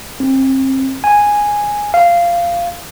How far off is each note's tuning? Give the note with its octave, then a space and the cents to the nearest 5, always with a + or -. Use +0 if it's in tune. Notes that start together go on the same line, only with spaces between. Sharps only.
C4 +30
G#5 -5
F5 -15